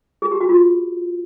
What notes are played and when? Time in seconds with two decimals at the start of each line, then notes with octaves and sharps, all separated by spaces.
0.22 G#4
0.31 G4
0.41 F#4
0.49 F4